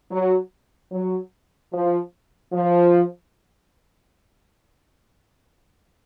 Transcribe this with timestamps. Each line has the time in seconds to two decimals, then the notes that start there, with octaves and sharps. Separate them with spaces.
0.11 F#3
0.92 F#3
1.73 F3
2.53 F3